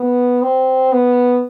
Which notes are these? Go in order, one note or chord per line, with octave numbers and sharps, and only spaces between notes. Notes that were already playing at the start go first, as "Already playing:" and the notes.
Already playing: B3
C4
B3